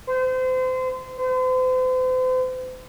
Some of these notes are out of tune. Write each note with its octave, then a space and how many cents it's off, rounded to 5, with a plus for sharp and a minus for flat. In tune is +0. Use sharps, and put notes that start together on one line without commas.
C5 -30
C5 -40